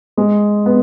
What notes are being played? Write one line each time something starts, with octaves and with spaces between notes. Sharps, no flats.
G#3
B3